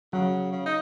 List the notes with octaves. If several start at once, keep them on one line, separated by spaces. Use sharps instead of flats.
C#3 F#3
C#3
D#4